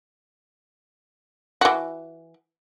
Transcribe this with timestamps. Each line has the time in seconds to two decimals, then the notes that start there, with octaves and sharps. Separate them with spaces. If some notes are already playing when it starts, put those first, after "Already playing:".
1.61 E3 F#4